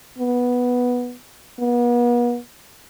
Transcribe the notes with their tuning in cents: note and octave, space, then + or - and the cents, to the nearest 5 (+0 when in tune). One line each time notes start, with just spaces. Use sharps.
B3 -5
B3 -40